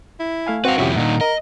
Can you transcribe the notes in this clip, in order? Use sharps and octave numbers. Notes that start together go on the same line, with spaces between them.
E4
A3 F5 G#5
C4 F#4 B4 F5
F2 C3 C#4 E4 F4 G4
A#2 D#3 D4 D#4 F#5
A#4 D#5